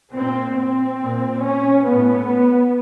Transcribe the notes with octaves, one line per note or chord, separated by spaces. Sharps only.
A#2 C4
C4
A#2
C#4
A2 B3